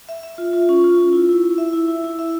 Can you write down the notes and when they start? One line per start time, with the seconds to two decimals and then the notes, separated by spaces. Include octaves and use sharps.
0.09 E5
0.23 E5
0.38 F4
0.53 F4
0.69 C#4
0.84 F4
0.99 F4
1.13 E4
1.29 E4
1.44 E4
1.58 E5
1.73 E4
1.88 E4
2.04 E4
2.19 E5